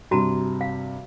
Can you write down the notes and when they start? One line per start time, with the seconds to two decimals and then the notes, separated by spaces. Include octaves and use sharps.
0.11 G2 C3 F#4 A5 A#5
0.61 F5